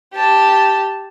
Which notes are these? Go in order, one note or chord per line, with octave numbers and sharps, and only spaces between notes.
G4 A5